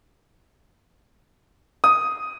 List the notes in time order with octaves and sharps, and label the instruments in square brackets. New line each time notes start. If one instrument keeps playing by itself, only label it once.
[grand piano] D#6